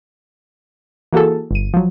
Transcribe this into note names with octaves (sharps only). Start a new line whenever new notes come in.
E3 A#3 F#4 G#4 A4
G1 D#7
F3 F#3